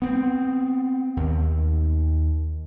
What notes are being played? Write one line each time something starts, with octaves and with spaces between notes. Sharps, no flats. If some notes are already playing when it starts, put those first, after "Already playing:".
B3 C4
D#2